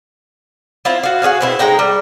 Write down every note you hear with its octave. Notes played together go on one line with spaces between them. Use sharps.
C4 E4 F4
F#4 F5
F#4 G#4 C#5 F5
B2 C4 E4
G#3 D#4 G5 A#5
G3